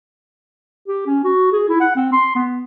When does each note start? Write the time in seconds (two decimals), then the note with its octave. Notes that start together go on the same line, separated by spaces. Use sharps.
0.88 G4
1.06 C#4
1.24 F#4
1.52 G#4
1.69 E4
1.80 F#5
1.96 C4
2.13 C6
2.35 B3